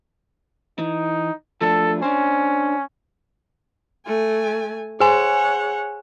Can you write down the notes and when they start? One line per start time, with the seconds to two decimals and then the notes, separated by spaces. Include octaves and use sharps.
0.79 E3 D#4
1.61 F3 A3 D4 A4
2.02 C#4 D4 C5
4.07 A3 G#5
5.00 G#4 C#5 F#5 G#5